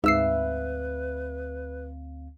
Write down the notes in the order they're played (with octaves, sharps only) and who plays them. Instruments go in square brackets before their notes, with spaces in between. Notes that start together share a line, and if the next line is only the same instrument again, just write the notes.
[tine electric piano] D2 C4 F5 [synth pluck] G#2 E6 C7 [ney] B4 [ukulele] E5